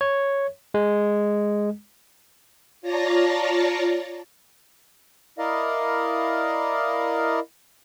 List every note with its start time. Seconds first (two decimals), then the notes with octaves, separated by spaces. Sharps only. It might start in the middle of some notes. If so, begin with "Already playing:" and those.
0.01 C#5
0.74 G#3
2.81 F4 C#5 D5 A5 A#5 A#6
5.38 E4 A#4 D5 D#5 F5